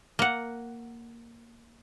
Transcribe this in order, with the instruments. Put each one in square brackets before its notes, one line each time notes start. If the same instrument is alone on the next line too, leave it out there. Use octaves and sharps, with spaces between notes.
[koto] A#3 F#5